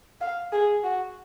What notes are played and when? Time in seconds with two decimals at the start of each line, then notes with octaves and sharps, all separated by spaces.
0.21 F5
0.52 G#4
0.84 F#4